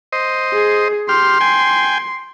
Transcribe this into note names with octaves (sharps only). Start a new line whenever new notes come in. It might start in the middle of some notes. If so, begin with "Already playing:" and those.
C5 D#5
G#4
G4 C6 F6
G5 G#5